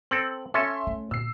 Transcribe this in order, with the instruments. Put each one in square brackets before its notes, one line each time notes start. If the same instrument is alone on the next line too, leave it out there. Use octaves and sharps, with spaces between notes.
[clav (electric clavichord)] C4 A4 [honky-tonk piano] F#7
[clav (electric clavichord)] C#4 A4 [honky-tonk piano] E5 C6
[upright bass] A3
[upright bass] A#2 D3 [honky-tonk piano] E6 C7